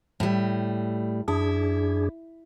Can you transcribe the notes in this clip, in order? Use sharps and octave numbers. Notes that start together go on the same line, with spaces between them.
A2 G3
F#2 D4 E4 G#4